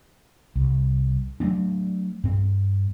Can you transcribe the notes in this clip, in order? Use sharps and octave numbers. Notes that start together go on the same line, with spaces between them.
C2
F#3 A3 C4 D4
G2 C4